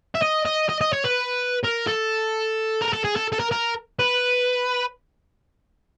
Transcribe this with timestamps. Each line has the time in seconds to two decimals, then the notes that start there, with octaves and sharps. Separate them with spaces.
0.15 E5
0.22 D#5
0.45 D#5
0.69 D#5
0.81 D#5
0.93 C#5
1.04 B4
1.64 A#4
1.87 A4
2.82 A#4
2.93 A4
3.05 G#4
3.16 A4
3.33 A4
3.40 A#4
3.52 A#4
3.99 B4